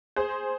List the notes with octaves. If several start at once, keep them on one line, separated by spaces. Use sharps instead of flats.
G#4 C5